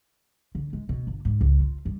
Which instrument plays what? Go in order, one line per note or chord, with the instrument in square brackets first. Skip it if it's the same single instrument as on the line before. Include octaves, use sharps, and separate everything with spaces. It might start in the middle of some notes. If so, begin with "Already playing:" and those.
[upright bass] D3
G#3
B2
G1
G#2
C#2
F4
G2